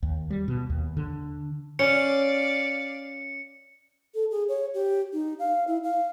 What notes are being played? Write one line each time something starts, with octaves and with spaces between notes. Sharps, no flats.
D#2
G3
B2
D#2
D3
C#4 D5 F5 C#7
A4
G#4
C#5
G4
D#4
F5
E4
F5